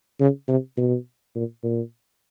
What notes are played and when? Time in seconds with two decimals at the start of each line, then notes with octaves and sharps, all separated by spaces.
0.20 C#3
0.49 C3
0.77 B2
1.35 A#2
1.64 A#2